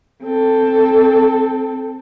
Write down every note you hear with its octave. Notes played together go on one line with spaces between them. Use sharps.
C4 A4